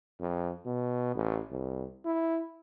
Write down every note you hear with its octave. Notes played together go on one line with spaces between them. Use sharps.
F2
B2
A1
C2
E4